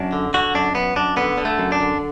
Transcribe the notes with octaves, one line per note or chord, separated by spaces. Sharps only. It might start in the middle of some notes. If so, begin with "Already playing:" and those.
Already playing: F#2 D4
D3
D3 F#4
F#2 D4
F#2 B3
F#2 D4
D3 B3
D3
A3
F#2
D4
D3